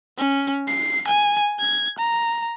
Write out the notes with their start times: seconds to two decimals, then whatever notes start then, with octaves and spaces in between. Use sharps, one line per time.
0.18 C#4
0.68 C7
1.08 G#5
1.60 G#6
1.99 A#5